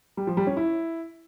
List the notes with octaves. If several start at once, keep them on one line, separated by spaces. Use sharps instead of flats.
G3
F3
G3
C#4
E4